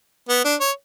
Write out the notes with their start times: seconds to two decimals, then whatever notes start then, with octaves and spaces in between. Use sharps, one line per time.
0.29 B3
0.45 D4
0.60 C#5